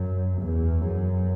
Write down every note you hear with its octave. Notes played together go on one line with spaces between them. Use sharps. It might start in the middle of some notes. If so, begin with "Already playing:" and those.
Already playing: F#2
E2
F#2